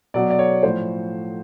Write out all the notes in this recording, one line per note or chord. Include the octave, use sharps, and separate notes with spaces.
B2 F#3 D5
D5
C#5
A2 F3 C5